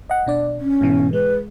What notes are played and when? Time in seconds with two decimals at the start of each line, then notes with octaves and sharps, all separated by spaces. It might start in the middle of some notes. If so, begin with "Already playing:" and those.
0.10 D#5 F#5
0.27 B2 D4 D5
0.61 C#4
0.81 G#2 B2 E3
1.13 G#3 B4